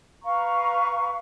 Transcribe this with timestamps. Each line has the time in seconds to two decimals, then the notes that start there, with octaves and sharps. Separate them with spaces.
0.23 B4 F5 A#5 C#6